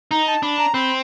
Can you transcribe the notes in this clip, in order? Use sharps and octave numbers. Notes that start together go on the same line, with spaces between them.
D#4 A#5
A5
D4 B5
A#5
C4 B5